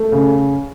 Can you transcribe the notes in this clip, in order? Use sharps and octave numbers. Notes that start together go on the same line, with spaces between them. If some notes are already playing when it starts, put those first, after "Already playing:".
Already playing: A3
C#3